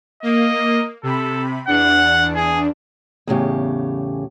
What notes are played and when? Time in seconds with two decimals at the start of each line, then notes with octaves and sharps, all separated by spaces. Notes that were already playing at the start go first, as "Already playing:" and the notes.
0.23 A#3 D#5
1.03 C3 A4 B5
1.68 E2 D4 F#5
2.36 G#4
3.27 E2 A2 C#3 G4